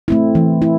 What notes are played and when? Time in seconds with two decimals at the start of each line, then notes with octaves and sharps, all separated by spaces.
0.08 A3 C4 E4
0.35 E3
0.62 E4